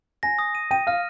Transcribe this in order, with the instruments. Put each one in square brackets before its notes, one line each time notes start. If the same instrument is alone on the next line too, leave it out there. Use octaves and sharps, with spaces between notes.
[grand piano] G#5 [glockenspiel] A#6
[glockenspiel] D#6
D#7
[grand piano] G5 [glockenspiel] D#7
[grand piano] F5 [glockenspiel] F6